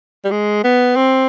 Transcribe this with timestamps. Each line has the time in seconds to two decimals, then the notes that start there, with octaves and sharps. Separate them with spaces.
0.24 G3
0.31 G#3
0.64 B3
0.96 C4